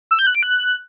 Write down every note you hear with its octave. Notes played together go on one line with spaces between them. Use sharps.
E6
G6
F#6
D7
F#6